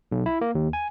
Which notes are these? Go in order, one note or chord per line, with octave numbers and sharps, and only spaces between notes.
B1
E4
A#3
D#2
G#5